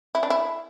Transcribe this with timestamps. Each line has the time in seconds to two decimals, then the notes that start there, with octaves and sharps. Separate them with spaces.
0.15 E4
0.23 D4
0.30 E4